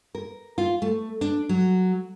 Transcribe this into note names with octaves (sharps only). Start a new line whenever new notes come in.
A#4
F4
A3
D4
F#3